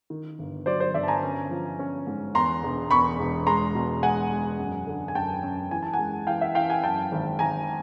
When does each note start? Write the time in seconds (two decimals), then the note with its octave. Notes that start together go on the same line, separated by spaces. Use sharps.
0.10 D#3
0.39 G1
0.66 F#3 C5 D5
0.80 C5 D5
0.94 G1 D5 E5
1.03 A5
1.08 G#5 A#5
1.22 C#4
1.51 F3
1.79 C#4
2.07 G#2
2.34 E2 A#5 C6
2.63 E1
2.91 E2 B5 C#6
3.19 E1
3.47 G#3 A#5 C6
3.75 B2
4.03 G#3 F#5 G#5
4.31 G#3
4.59 F#2
4.87 D3
5.08 G#5
5.15 F#2 G5 A5
5.43 F#2
5.71 E3 G#5
5.83 A5
5.93 F#5 G#5
5.99 G#3
6.27 E3 F5 G5
6.41 E5 F#5
6.55 E3 F5 G5
6.70 F#5 G#5
6.83 F#2 G5 A5
7.12 G#1
7.39 G#1 G#5 A#5